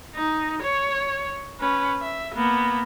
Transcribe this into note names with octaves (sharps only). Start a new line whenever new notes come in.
D#4
C#5
C#4 B4
E5
A#3 B3